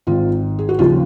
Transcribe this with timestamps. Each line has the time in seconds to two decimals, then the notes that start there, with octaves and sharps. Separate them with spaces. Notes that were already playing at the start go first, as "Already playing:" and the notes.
0.07 G#1 G#2 D#3 F4
0.59 G#4
0.69 F#4
0.79 D#2 C#3 F3 F4